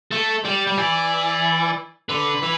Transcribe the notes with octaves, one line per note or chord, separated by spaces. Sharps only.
A3 A4
G3 D5
G3
E3 D5
D3 B4
E3